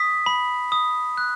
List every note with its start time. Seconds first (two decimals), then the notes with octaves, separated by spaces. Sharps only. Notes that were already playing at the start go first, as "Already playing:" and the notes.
Already playing: D#6 B6
0.26 B5
0.72 D#6
1.17 F#6